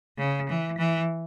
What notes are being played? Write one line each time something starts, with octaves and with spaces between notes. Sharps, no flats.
C#3
E3
E3